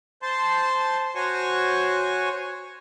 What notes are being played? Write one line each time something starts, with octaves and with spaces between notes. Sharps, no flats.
C5 A5 C6
F#4 C5 C#5 G#5 C#6